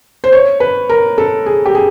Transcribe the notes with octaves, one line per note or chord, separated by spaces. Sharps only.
C5
C#5
B4
A#4
A4
G#4
G4
G#4